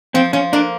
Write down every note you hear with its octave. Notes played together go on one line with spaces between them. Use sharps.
F3 C4
F3 C#4
A#3 D4